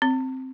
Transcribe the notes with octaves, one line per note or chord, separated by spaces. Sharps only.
C4